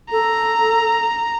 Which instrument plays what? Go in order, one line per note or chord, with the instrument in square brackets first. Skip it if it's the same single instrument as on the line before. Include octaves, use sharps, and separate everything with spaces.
[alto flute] A4 [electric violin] A#5